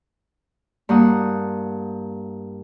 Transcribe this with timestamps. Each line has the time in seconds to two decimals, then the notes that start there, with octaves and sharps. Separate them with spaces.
0.89 G2 A#3 F#5 D#6